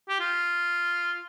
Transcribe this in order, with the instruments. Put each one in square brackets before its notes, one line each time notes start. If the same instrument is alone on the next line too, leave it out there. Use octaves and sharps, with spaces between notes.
[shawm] G4
F4